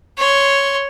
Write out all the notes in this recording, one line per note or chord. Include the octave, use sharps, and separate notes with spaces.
C#5 C6